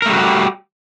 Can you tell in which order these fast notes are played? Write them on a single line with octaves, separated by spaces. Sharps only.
A#4 A3 G3 F#4 G4